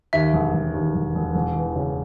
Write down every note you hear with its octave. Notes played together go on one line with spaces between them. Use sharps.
D#2 E5
E1
E1
D#2
E1
E1
E1
E3
C#3